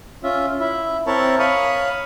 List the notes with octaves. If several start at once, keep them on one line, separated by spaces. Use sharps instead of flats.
C#4 F4 E5
E4 E5
C4 E4 A#4 C#5 A5
C#5 F5 B5 C#6 D#6